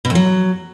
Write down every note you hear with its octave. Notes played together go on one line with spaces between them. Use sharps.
B2
F2
F#3